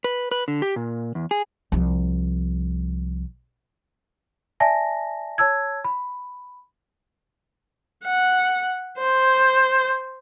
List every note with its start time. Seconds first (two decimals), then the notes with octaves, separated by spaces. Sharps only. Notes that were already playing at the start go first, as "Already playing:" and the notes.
0.04 B4
0.31 B4
0.48 D3
0.62 G4
0.76 A#2
1.15 E2
1.31 G#4
1.72 C2 F3
4.60 D5 E5 G#5 A5 A#6
5.38 C#5 A5 E6 G#6
5.84 B5
8.05 F#5
8.98 C5